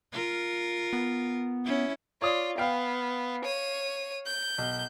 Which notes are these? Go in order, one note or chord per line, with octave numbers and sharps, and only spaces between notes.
F4 A#4
B3
C#4 E4
F4 C#5 D5 D#6
B3 F5 G5
C#5 D#7
G6
B1